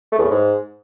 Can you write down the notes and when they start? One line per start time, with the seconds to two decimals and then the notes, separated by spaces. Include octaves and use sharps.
0.12 A3
0.18 E2
0.25 A2
0.31 G#2